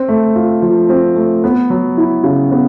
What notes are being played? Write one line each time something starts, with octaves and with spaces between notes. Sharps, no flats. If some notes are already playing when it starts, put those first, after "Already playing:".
Already playing: C4
A3
F4
F3
C4
A3
B3
F#3
E4
C#3
B3